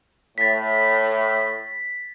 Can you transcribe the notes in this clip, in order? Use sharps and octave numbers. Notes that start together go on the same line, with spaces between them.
A2 A6 B6